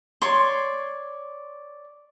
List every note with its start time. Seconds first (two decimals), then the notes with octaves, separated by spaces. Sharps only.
0.22 C#5 D5 C6